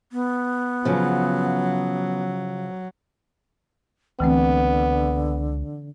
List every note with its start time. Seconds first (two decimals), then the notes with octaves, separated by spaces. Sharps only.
0.12 B3
0.85 C#3 F3 F#3
4.20 C#2 D3 E3 A3 B3 C4